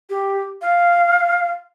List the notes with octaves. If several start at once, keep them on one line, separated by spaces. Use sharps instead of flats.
G4
F5